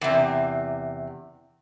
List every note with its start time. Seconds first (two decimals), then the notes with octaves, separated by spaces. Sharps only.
0.01 E2 C3